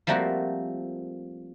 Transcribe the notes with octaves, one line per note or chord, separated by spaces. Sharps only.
F3 G3 A3 A#3 C4 F#4